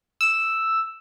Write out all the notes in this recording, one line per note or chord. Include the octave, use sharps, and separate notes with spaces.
E6